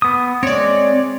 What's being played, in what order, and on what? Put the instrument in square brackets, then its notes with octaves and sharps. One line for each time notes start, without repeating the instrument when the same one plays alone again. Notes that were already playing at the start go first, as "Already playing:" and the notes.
[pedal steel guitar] B3 D#6
[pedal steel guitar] G#3 C4 [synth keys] C#5 D5